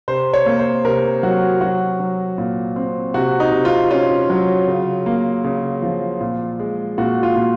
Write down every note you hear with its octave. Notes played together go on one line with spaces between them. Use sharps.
C3 C5
C#5
A#3
C5
C3 A#4
F#3 F#4
F#3 F#4
F#3
A#2
C4
C3 F#4
D#4
C3
F4
C#4 F4
F#3
C#3
A#3
C#3
F3
A#2
G#3
A#2 F#4
F4
A#2